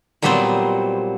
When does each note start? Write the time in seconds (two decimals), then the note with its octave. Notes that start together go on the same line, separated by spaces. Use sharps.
0.22 A#2 F#3 G3 B3 C4 C5